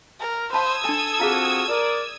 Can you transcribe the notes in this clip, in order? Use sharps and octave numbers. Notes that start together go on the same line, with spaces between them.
A#4
C5 F5 A5 B5 D#6 E6 G#6
D4 A4 G#5
C4 F4 F#4 G#4 F5 A#5
A#4 D5